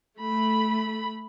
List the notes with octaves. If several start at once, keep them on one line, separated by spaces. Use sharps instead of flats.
A3 B5